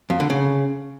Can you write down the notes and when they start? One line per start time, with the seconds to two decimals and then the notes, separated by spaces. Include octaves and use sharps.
0.10 F2
0.20 D3
0.30 C#3